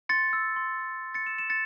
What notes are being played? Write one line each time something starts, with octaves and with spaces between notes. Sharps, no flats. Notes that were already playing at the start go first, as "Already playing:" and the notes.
C6 A6 C#7
E6
C6
E6
C6
A6 C#7
E6 C#7 E7
C#7 E7
C6 A6 C#7